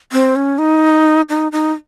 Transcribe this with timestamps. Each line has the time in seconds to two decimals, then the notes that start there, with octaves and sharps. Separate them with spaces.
0.12 C4
0.36 C#4
0.58 D#4
1.29 D#4
1.52 D#4